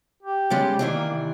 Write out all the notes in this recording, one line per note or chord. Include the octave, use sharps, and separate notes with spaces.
G4
C#3 G3 G#3
D#3 E3 D4
A#3
C3